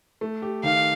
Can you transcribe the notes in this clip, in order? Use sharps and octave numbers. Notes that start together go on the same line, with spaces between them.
A3
G4
D#3 F5